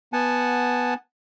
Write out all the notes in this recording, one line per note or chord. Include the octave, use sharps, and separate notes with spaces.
B3 F#5 G#5 A5